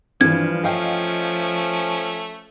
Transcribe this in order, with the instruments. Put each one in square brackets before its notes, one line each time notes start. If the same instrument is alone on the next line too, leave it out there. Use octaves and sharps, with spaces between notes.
[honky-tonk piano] G2 E3 [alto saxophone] F3 [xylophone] G#6
[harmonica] A3 C#4 [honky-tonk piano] D#5 F5 G5